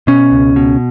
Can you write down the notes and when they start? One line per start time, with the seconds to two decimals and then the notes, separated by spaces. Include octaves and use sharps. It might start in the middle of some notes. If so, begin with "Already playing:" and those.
0.07 B2 C#4
0.32 C#2
0.56 B2